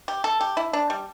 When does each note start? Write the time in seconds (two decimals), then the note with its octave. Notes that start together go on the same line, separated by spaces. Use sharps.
0.08 G4
0.24 A4
0.41 G4
0.57 E4
0.73 D4
0.90 G3